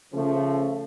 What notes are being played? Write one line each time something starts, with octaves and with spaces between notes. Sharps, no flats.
C#3 F3 A3